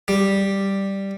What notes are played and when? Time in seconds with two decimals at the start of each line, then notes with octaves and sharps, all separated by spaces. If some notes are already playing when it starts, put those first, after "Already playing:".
0.08 G3